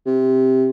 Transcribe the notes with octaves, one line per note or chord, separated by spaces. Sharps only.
C3